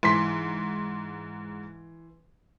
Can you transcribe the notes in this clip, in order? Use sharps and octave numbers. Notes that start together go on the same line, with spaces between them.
G#2 E3 C6 B6